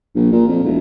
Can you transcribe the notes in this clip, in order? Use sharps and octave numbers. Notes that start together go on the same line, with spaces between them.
A#1
A#2
F2
E1